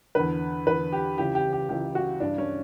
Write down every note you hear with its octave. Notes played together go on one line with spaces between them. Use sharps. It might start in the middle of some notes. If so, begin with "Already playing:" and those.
E2 D3 B4
E2 D3 B4
G4
C#2 C#3 E3 G4
G4
G4
C#2 C#3 E3 G4
F#4
G2 E3 D4
C#4